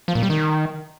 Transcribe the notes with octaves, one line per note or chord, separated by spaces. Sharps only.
F3
A#2
G3
D#3